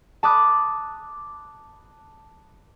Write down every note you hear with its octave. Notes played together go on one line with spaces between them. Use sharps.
A5 B5 D6 D#6 F#6